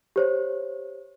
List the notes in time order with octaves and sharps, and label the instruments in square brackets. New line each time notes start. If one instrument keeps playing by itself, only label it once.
[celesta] G4 C5 C#5